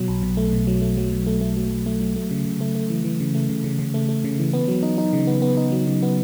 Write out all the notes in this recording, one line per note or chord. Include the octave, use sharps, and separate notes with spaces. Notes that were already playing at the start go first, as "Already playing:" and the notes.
Already playing: B2 F#3
B1
B2
A3
B2
F#3
A3
F#3
B2
A3
A3
F#3
B1
A3
F#3
A3
C#3
C#3
A3
A3
E3
E3
C#3
A3
C#3
C#3
C#3
A3
A3
C#3
E3
B3
F#3
D#4
D#4
C#3
B3
B3
D#4
F#3
C#3
B3